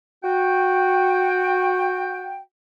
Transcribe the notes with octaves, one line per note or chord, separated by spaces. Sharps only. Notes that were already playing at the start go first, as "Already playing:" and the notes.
F#4 G5